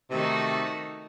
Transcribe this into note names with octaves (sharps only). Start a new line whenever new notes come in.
C3 D#3 A3 D#4 F#4 A4